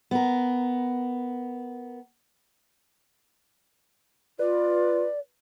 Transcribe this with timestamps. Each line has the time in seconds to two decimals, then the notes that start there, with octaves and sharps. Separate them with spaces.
0.11 B3 A#4
4.39 F4 B4 D5